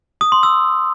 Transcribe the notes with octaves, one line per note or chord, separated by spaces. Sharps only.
D#6
C6
E6